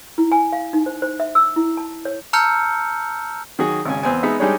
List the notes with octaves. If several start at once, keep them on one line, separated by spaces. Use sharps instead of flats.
E4
G#5
F5
D#4
C5
C5
E5
E6
E4
A5
C#5
A5 A#5 E6 F6 G6 C#7
D#3 F#3 F#4 G#4
G#1 C#3 G#5
E2 B3 C4 G#5
G#3 B3 D#4 E5
G3 G#3 D4 D#4 G#4 C#5